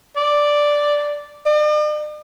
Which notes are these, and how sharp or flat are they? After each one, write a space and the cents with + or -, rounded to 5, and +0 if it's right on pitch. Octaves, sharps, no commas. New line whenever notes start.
D5 +0
D5 +45